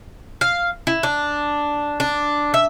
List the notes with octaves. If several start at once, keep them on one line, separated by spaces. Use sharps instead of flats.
F5
E4
D4
D4
E5